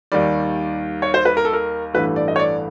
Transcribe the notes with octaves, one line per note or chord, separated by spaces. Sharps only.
D#2 D#3 G3 D5
C#5
C5
B4
A#4
A4
A#4
A1 G2 E3 A3 B4
D5
D#5
C#5
D5